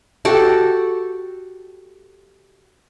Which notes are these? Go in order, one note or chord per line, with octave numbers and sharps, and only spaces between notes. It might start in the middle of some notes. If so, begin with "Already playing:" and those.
F#4 G4 A4